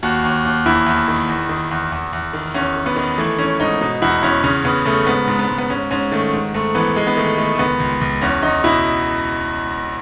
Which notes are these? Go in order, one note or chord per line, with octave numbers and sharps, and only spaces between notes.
D#2 F#4
D#2
D#2
E2 E4
E2
D#3
E2
D#3
E2
E2
E2
D#3
E2 C#4
D#3
B3
D#3
E3 A3
E3 C#4
G#2 D#4
B2 D#4
E2 E4
E2 C#4
C#3 C#4
C#3 B3
C#3 A3
G#2 B3
G#2
B3
G#2
B3
G#2 C#4
G#2 C#4
D#3 A3
G#2
G#2 A3
E3 B3
D#3 G#3
B3
D#3 A3
D#3 A3
A3
C#2 B3
C#2
C#2
E2 C#4
E2 D#4
B2 E4